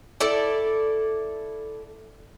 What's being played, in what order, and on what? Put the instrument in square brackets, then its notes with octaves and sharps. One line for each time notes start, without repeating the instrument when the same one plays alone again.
[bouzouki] E4 A4 D5